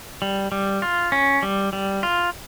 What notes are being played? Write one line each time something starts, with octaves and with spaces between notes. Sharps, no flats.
G3
G3
F4
C#4
G3
G3
F4